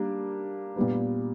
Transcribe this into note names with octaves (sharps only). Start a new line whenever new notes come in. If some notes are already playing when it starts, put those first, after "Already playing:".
Already playing: G3 A#3 D4
A#2 G3 B3